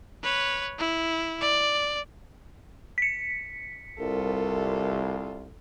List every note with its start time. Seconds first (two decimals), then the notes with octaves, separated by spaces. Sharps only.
0.23 B4 C#5
0.79 E4
1.41 D5
2.98 B6 C#7
3.99 C2 F4 A4 A#4